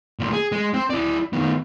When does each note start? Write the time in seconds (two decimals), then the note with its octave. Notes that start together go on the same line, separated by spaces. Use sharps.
0.19 D2 A#2
0.32 G#4
0.52 G#3
0.74 C4
0.90 E4 D5
1.33 D#3 B3